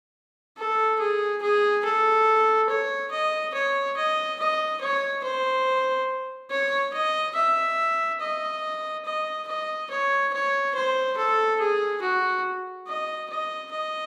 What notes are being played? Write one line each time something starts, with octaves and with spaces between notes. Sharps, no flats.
A4
G#4
G#4
A4
C#5
D#5
C#5
D#5
D#5
C#5
C5
C#5
D#5
E5
D#5
D#5
D#5
C#5
C#5
C5
A4
G#4
F#4
D#5
D#5
D#5